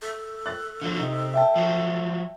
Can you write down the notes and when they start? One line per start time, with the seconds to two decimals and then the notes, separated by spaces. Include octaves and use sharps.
0.02 A4
0.46 F#6 A6
0.81 D3 F3 F#3
0.99 C3 D#4
1.34 E5 G5 A5
1.56 F3 F#3